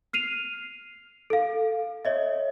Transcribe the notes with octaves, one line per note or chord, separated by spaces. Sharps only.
F6 C7 D#7 F7
A4 F5
C#5 D#5 E5